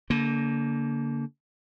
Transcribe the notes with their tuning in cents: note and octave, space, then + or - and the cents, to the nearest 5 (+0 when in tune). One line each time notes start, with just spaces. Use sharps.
D3 -35 A#3 +0